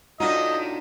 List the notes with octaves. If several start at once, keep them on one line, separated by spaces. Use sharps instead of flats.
A2 C3 D4 D#4 F4 F#4 D#5